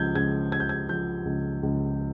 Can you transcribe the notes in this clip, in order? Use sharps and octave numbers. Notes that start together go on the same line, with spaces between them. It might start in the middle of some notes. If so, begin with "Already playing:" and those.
Already playing: C#2 F3 G6 G#6
C#2 G#6
F3 G#6
G6
G#6
F3 G6
C#2
C#2